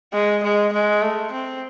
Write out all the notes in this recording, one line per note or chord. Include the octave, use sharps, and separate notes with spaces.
G#3
G#3
G#3
A3
C4